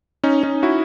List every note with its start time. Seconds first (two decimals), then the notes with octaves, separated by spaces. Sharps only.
0.24 C#4 D#4
0.43 C#4 D#4
0.63 E4 F#4